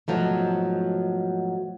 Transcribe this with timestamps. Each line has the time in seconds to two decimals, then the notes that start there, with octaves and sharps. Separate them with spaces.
0.08 G#2 B2 F3 F#3 A3